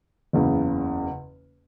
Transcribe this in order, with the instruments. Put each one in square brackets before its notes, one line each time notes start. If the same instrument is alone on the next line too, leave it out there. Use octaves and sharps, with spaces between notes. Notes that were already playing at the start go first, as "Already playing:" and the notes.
[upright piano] F#1 E2 C#3